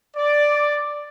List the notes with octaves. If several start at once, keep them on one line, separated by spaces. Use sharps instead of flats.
D5